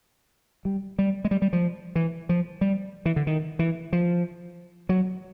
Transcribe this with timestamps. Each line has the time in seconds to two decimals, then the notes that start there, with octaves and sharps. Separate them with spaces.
0.65 G3
0.99 G3
1.25 G#3
1.31 G3
1.42 G3
1.53 F3
1.95 E3
2.29 F3
2.61 G3
3.05 E3
3.16 D3
3.27 D#3
3.59 E3
3.93 F3
4.89 F#3